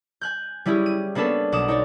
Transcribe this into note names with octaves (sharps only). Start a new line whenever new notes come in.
G#5 F#6 G6
G3 C#4 E4 G4 G#4
D#7
A#3 B3 C#4 D4 A4 B4
B1 F#5 D6 D#6 E7
D#4 C#5 D5